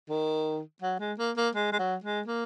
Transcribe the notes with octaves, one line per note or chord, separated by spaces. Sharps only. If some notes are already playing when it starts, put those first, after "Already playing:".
D#3
F#3
G#3
A#3
A#3
G#3
G#3
F#3
G#3
A#3